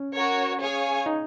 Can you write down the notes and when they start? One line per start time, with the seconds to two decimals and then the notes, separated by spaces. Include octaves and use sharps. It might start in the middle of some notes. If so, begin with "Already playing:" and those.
Already playing: C#4
0.15 F#4 A#4 C#5
0.61 G#4 C#5 F5 G#5
1.06 D#4